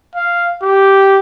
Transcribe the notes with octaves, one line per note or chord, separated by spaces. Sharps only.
F5
G4